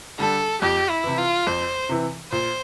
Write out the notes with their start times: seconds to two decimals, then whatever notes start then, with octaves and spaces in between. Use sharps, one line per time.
0.19 D3 G3 D4 A4
0.62 F2 G4
0.90 E4
1.04 C3 E3
1.18 F4
1.47 F2 C5
1.89 C3 E3
2.32 A#2 C5